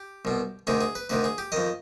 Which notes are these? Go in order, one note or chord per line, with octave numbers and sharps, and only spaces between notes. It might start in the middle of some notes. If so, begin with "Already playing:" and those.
Already playing: G4
C2 B2
D2 C3 D#3 G#4
G#4
B4
D2 C3 D#3 B4
G#4
G4
F2 D#3 D#5